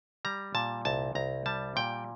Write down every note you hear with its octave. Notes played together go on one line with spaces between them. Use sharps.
G3 A#5
A#2 A5
C2 A5
C2 A#5
G3 A5
A#2 G5